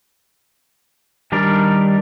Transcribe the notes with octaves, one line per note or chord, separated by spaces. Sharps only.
D#3 G3 D4 A#4 D5